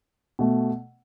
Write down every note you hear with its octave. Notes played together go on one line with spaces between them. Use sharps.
B2 A3